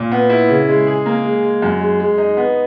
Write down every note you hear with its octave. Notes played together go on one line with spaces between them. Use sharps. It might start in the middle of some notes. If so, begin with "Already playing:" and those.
Already playing: A#2
B3
E4
C#3
G#3
G#4
A#3
G#3
G#3
F#2
G#3
G#3
D#4
B3